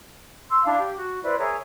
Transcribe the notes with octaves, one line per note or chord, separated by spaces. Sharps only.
C6 E6
D4 E4 F5 A5
G4
F#4
E4 B4 C5 D5
G#4 A#4 C#5 E5